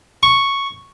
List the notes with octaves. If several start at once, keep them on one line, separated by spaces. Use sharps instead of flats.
C#6